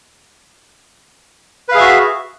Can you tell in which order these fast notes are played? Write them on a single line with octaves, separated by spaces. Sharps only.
B4 F5 G#4 E5 F#4